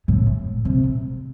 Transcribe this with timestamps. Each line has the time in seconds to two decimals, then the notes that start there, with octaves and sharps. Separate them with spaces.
0.08 A2
0.65 C3